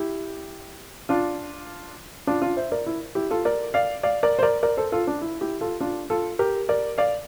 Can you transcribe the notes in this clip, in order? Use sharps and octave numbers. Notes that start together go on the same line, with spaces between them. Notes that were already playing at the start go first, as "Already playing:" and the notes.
Already playing: E4 G4
D4 F4
D4 F4
D4 F4
C5 E5
A#4 D5
E4
E4 G4
F4 A4
A#4 D5
D5 F5
D5 F5
A#4 D5
C5
A#4 D5
A#4 D5
A4 C5
F4 A4
D4
E4
E4 G4
F4 A4
D4 F4
F4 A4
G4 A#4
A#4 D5
D5 F5